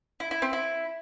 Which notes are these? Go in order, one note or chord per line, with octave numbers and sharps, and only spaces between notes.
E4
E4
C4
E4